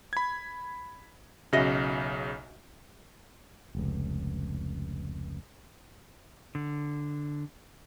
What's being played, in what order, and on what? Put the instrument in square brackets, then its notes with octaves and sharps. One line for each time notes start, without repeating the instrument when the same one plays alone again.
[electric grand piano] B5 G#6
[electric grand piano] B1 C#3 [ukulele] F#4 D#5 E5
[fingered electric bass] F1 C#2
[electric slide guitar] D3